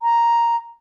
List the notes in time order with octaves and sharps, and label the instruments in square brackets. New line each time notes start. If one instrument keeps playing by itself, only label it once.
[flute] A#5